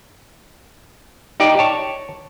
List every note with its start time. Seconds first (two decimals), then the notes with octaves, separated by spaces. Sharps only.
1.40 D#4 G4 D5
1.59 C#5 A5